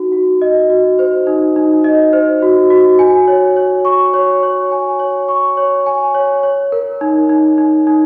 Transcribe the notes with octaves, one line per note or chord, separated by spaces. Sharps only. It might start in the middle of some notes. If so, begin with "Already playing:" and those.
Already playing: D#4 F#4
F#4
D#5
F#4
C5
D#4
D#4
D#5
C5
F#4
F#4
G#5
C#5
C#5
C#6
C#5
C#5
G#5
C#5
C#6
C#5
G#5
C#5
C#5
A#4
D#4
D#4
D#4
D#4